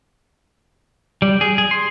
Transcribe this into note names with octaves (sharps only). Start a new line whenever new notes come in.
G3
G#4
G#4
C6